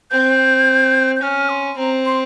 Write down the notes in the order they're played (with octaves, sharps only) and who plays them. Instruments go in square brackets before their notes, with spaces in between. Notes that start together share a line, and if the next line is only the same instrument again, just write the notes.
[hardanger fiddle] C4 [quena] G6
[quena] G6
[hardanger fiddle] C#4 [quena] F6
[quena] C6
[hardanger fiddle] C4 [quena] A#5
[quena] C6